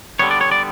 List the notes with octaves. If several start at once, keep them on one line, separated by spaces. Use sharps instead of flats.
D3 G3 B3 C#5
D5
C#5
D5